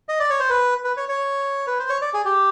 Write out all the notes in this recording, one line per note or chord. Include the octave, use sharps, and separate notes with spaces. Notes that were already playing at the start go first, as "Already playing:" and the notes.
D#5
D5
C#5
C5
B4
B4
C#5
C#5
B4
C5
C#5
D5
G#4
G4